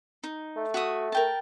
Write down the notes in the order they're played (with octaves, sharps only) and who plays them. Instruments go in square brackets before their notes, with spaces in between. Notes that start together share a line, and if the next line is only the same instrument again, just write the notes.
[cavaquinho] D#4
[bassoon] A3
[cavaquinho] F#4 E5 D#6
A#4 G5 A5